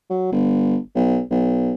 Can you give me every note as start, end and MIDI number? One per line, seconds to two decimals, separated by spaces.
0.10 0.31 54
0.32 0.76 31
0.95 1.20 35
1.31 1.73 35